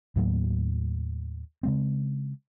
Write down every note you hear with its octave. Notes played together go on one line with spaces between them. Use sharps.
D#2 A2 F#3 A#3
C#3 G#3 C4